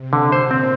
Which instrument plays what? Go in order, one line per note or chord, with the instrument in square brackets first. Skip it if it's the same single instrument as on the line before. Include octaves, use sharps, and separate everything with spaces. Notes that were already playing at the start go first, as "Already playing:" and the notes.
Already playing: [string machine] C3
[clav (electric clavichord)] D3
[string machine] A#2 [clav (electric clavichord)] C5
[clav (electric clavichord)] C4